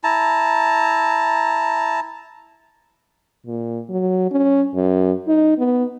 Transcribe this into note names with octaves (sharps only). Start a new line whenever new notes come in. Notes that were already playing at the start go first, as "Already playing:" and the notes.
E4 A5 A#5
A#2
F#3
C#4
F#2
D#4
B3